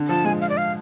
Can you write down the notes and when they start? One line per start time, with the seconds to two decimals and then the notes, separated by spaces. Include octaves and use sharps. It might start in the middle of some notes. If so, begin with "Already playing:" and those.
Already playing: D3
0.09 F3 A5
0.25 G#3 G#5
0.41 F5
0.49 D5
0.57 F5